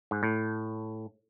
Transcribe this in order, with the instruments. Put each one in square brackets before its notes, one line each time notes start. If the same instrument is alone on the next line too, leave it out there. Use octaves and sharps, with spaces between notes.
[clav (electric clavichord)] G#2
A2